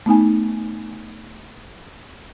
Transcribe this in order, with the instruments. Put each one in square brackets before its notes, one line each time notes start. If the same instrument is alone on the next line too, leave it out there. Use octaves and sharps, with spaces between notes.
[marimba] A3 B3 D#4 G#5